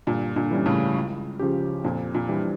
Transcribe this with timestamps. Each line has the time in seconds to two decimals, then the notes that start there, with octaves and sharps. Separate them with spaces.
0.07 G2 A#2 D3
0.36 A#2 D3
0.51 E3 G3 C#4
0.66 A2 C#3
0.95 C#2
1.39 C#3 F3 C#4 G4
1.84 F2 A#2
2.15 A#2
2.29 E3 G3 D4